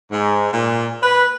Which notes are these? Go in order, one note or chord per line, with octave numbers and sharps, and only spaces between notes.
G#2
A#2
B4